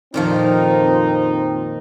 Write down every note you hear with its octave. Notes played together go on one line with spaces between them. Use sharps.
F2 A#2 D#3 F3 C4 D#4